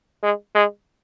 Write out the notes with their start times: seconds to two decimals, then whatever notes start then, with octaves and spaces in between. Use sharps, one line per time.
0.23 G#3
0.55 G#3